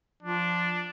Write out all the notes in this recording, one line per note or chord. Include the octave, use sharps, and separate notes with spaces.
F3 D4